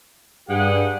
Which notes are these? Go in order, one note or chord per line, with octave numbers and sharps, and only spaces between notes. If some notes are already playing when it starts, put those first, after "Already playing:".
G2 G4 G#4 F#5